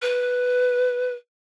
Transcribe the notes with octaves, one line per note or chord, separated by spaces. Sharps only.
B4